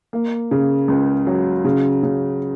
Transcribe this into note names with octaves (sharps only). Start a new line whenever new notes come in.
A#3
C#3
C#2
F#3
C#3
C#3